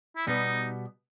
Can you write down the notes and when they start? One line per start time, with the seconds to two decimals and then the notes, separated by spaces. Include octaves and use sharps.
0.16 E4
0.27 B2 G3 B3 D#4